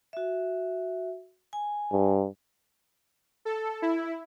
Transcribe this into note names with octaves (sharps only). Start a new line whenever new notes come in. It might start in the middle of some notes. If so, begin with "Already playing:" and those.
F#4 E5
G#5
G2
A4
E4